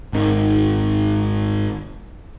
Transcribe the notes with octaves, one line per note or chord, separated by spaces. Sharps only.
G#1 D#3